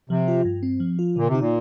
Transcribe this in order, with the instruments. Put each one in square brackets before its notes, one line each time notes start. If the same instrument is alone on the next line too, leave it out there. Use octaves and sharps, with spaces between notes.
[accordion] C3 [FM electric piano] F3
[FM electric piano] F4
G2
C4
F3
F4
[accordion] A#2 [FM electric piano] D3
[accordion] C3
[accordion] A#2 [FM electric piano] D#4